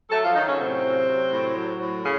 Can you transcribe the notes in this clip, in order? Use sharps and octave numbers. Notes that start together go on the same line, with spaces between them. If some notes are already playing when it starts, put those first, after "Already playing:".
F#3 A3 A4
F3 F4
D#3 F#3 D#4
C#3 C#4
A2 C3 C4
F#3
F#3
A2
F#3
A2
C#3